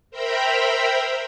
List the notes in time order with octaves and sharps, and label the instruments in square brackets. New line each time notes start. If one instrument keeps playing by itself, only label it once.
[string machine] A#4 C5 E5 G5 A#5 B5